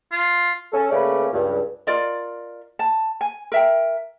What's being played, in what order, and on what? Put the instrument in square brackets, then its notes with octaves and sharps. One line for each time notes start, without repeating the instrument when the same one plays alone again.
[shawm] F4
[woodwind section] C#4 A4
C#3 A3 A#3 C#4 B4 D5
C#2 G2
[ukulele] F4 A#4 D5 D#5
A5
G#5
A#4 E5 G5